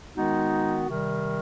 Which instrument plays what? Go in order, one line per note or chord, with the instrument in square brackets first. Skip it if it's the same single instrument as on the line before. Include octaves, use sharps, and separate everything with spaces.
[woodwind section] D#3 G#3 B3 D#4 F#4
C3 D#3 G3